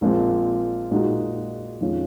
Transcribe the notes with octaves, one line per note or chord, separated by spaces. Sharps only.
A#1 A#2 F3 G#3 C4
A#2 G#3 D#4 F#4
F2 D#3 G#3 C#4 F4